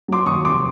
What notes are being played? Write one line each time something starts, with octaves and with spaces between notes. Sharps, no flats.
F#3 C6 D6
D#2 C#6 D#6
F1 C6 D6